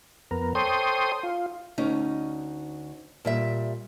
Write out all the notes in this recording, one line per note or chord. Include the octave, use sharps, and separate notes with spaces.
F2 B3 A#4
A4 C5 C#5 G5 C6 D#6
F4
D2 C#4 D#4
A#2 G3 E5